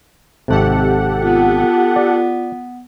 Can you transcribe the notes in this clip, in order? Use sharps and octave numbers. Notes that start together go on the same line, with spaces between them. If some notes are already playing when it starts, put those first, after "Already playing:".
G#1 C3 G4 A4 F#5
B3 F4
D5